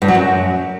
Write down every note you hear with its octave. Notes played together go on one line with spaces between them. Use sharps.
G2
F#3
F#2